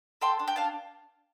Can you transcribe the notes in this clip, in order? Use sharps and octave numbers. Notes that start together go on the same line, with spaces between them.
A4 G5 C6
D4
G5
D4 F5 A5